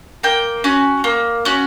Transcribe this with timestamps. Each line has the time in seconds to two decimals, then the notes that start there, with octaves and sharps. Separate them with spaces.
0.23 A#3 G5
0.64 C#4 F#4
1.04 A#3
1.45 C#4 F#4